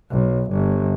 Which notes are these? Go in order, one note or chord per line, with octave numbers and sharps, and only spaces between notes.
B1
G1